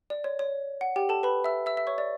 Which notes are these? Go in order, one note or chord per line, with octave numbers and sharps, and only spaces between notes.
D5
C#5
C#5
F#5
G4 G5
A4 A5
B4 B5
E5 E6
E5 E6
E5 E6
C#5 C#6
D5